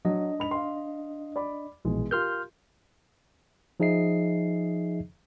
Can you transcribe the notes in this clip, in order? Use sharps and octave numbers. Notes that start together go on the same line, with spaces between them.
F#3 D4 D#5
G#2 B5 F7
F5 C6
D5 B5 D6
A#1 B2 E3 G#3
F4 G4 A#4 C6 F6 G6
F3 D#4 G#4 D#5 E5 C7